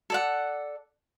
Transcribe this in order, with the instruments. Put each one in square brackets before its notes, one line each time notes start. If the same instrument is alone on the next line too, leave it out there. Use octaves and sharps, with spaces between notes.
[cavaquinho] A4 D5 F#5